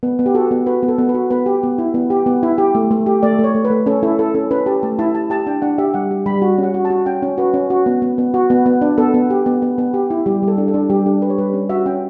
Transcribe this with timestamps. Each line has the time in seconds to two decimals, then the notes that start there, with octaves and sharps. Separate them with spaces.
0.03 B3 B4
0.19 B3
0.26 G4
0.34 F#4 A4
0.51 B3
0.66 F#4 B4
0.83 B3
0.88 A4
0.99 B3
1.09 B4
1.14 F#4
1.30 B3 B4
1.46 G4
1.63 B3
1.78 E4
1.94 B3
2.10 G4
2.26 B3
2.43 E4
2.58 G4
2.75 A3
2.91 A3
3.06 G4
3.23 A3 D5
3.39 A3 C#5
3.55 A3
3.65 B4
3.70 A3
3.86 C#4 A4
4.03 E4 A4
4.19 E4 A4
4.35 C#4 A4
4.51 C#4 B4
4.66 G4 A5
4.83 A3 A5
4.99 E4 A5
5.14 G4 A5
5.30 G4 A5
5.47 D4 G5
5.62 D4 F#5
5.78 G4 E5
5.94 G3 F#5
6.11 G4
6.26 G3 B5
6.42 F#4
6.58 C#4
6.63 F#5
6.74 F#4
6.85 A5
6.90 F#4
7.06 C#4 G5
7.23 C#4
7.38 F#4 B4
7.54 C#4
7.70 F#4
7.86 B3
8.02 B3
8.18 B3
8.34 F#4
8.50 B3
8.66 B3
8.82 D4
8.98 B3 A4
9.14 B3
9.30 G4
9.46 B3
9.62 B3
9.78 B3
9.94 G4
10.10 E4
10.26 G3 G4
10.43 G3 A4
10.58 D4
10.68 A4
10.74 D4
10.90 G3 G4
11.06 D4 A4
11.22 G4 B4
11.30 C#5
11.38 G3 B4
11.54 C#4
11.69 F#4 E5
11.86 C#4 G5